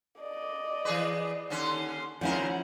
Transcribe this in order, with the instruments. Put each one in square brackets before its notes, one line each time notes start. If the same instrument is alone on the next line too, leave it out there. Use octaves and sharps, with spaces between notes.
[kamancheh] D5 D#5
[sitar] E3 G#4 B4
[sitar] D#2 D3 C#4 [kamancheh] C6
[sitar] D#2 C#3 A#4 [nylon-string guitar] F3 C#4 E4 [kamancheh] F#5